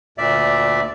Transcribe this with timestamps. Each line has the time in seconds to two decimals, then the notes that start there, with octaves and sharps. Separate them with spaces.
0.18 D2 A#2 D5 E5